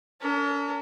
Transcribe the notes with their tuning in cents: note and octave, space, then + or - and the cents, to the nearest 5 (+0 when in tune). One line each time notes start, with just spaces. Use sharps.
C#4 +45 A#4 -40